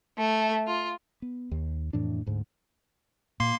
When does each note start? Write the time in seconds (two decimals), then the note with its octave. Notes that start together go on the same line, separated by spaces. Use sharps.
0.18 A3
0.67 F4
1.22 B3
1.51 D#2
1.93 F2 A2 E3 D4
2.26 D2 G#2
3.40 A#2 A#3 C6 C7